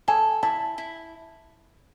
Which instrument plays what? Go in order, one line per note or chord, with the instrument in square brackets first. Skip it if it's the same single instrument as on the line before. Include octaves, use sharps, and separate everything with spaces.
[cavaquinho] A4 [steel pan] G#5
[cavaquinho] E4 [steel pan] A5
[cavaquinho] E4